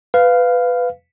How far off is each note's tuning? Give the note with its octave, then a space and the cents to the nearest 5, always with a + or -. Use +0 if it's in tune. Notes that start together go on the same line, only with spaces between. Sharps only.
B4 +15 F5 +0